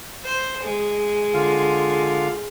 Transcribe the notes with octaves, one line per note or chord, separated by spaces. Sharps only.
C5
G#3
D3 F4 F5